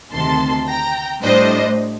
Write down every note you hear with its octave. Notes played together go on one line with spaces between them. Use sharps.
D2 C3 D#3 A5 C6
G5 A#5
A2 G3 D4 C5 D#5